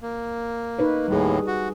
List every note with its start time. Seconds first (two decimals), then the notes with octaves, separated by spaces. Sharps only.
0.01 A#3
0.79 D#4 B4 C#5
1.08 D#2 A2 G3 G#4
1.47 F#4